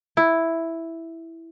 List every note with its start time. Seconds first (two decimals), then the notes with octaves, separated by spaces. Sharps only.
0.17 E4